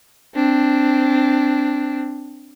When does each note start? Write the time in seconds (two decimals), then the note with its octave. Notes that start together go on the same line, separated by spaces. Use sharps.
0.35 C4 D4